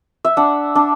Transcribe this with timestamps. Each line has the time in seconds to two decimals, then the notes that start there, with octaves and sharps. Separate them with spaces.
0.25 E5
0.37 D4 F#5
0.75 D4